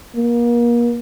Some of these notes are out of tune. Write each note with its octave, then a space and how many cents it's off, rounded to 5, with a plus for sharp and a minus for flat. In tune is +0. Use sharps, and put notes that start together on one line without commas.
A#3 +35